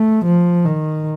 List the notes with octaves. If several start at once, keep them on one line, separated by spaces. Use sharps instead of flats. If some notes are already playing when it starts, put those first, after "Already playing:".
Already playing: A3
F3
D#3